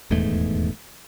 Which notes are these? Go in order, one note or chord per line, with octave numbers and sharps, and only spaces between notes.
D#1 E2 G#2 A3